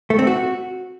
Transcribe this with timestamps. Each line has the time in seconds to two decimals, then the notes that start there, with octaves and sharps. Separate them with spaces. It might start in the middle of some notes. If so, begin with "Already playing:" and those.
0.10 A3
0.19 C4
0.27 F#4